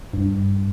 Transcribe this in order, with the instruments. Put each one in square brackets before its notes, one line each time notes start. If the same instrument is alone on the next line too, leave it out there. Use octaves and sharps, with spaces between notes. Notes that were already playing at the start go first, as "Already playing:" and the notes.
[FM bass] G2